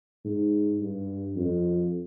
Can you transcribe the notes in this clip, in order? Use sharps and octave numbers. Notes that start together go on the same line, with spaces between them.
G#2
G2
F2